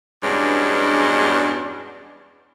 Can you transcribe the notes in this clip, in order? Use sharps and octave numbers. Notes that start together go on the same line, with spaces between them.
E2 G2 B2 G#3 C#4 D4